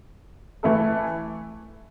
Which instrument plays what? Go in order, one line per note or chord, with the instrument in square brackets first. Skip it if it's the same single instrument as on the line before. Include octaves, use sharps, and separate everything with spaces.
[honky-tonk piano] E3 A3 E4 A4